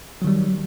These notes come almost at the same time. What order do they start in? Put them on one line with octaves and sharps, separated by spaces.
F#3 D#3 G3